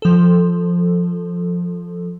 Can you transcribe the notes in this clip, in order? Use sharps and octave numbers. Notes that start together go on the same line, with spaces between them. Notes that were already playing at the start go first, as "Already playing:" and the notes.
F3 A4